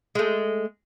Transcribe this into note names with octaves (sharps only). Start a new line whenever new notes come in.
G#3 A3